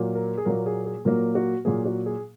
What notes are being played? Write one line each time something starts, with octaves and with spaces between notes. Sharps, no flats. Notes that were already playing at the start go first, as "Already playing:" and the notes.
Already playing: A#2 F#3 A#3
A#4
G#4
A#2 F#3 A#3 A#4
G#4
G#4
A#2 F#3 A#3 A#4
F#4
A#2 F#3 A#3 G#4
F#4
G#4